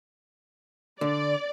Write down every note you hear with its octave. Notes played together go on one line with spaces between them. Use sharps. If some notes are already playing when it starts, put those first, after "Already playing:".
D3 D5